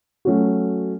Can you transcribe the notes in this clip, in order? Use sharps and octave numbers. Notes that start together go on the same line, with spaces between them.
F#3 A3 C#4 F#4